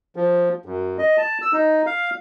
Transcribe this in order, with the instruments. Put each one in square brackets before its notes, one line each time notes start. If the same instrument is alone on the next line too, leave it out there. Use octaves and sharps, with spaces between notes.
[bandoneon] F3
F#2
D#5
A5
E6
D#4
F5